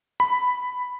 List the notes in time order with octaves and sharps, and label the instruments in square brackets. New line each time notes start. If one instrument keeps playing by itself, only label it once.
[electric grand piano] B5